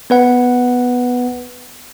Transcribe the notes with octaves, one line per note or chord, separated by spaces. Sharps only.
B3 B4 F#5